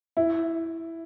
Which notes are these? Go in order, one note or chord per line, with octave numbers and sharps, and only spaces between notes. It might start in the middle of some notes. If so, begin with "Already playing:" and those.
E4